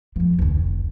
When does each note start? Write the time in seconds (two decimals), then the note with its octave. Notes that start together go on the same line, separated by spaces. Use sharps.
0.16 F2 F3
0.39 F1 D2